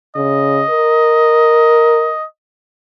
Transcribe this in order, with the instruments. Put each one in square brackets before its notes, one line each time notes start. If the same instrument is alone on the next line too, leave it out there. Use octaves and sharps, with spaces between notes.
[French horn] C#3 [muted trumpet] D#5
[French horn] A#4